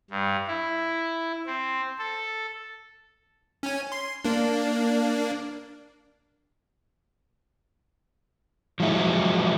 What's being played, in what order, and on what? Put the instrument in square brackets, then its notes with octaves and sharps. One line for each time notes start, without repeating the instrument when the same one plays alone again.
[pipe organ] G2
E4
C4
A4
[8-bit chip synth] C#4 G#5
C6
A#3 D4
[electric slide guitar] F3 F#3 G#3 E4